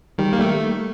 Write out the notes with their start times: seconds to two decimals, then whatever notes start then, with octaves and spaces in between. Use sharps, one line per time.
0.18 D#3 G3
0.33 A#3
0.39 G3 A3